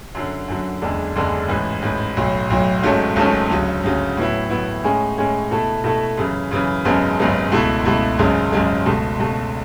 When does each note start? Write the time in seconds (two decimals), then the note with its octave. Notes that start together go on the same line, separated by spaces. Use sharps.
0.15 F#2 D3 F#3
0.48 F#2 D3 F#3
0.82 F#1 E2 D3 G#3 D4
1.16 F#1 E2 D3 G#3 D4
1.49 A1 G#2 E3
1.82 A1 G#2 E3
2.17 B1 A2 F#3
2.50 B1 A2 F#3
2.83 G#1 G#2 F#3 A3 C#4
3.16 G#1 G#2 F#3 A3 C#4
3.50 D2 C#3 F#3
3.83 D2 C#3 F#3
4.17 A2 F#3 B3 E4
4.50 A2 F#3 B3 E4
4.84 A2 G#3 C#4 G#4
5.18 A2 G#3 C#4 G#4
5.51 B2 A3 E4 A4
5.84 B2 A3 E4 A4
6.17 F#2 C#3 E3
6.51 F#2 C#3 E3
6.85 G#1 F#2 C#3 G#3 B3
7.19 G#1 F#2 C#3 G#3 B3
7.52 C#2 B2 A3 E4
7.85 C#2 B2 A3 E4
8.19 G#1 F#2 C#3 G#3
8.52 G#1 F#2 C#3 G#3
8.86 C#2 B2 A3
9.19 C#2 B2 A3